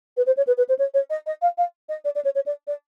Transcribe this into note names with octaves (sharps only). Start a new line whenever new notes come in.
B4
C5
C#5
B4
B4
C5
C#5
C#5
D#5
D#5
F5
F5
D#5
D5
D5
C#5
C#5
D5
D5